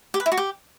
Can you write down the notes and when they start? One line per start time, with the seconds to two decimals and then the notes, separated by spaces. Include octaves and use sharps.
0.14 G4
0.20 B4
0.26 E4
0.32 F#4
0.37 G4